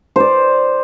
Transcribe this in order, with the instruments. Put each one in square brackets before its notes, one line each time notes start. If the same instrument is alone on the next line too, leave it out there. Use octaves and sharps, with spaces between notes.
[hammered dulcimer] C5 D5